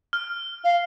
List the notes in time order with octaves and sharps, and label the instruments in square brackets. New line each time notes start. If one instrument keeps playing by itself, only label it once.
[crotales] F6
[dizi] F5